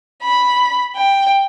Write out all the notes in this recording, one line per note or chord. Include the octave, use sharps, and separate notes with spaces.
B5
G5